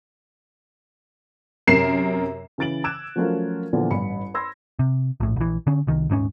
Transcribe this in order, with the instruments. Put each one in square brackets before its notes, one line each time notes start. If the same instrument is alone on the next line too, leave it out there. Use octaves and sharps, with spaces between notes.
[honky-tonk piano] F#2 C3 A#4 C7 E7
[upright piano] C#3 E3 A6 D7 F#7
D6 E6 F#6 G#6 D7 E7
F3 F#3 A3 C#4 F4 A#4
A#2 D3 E3 F3 B3
A1 G2 B5 C#7
B5 C6 E6 G#6 A#6
[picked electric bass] C3
A#1 A2
A#1 E3
D3 C#4
C2 D#3
D#1 G#2 B3 C#4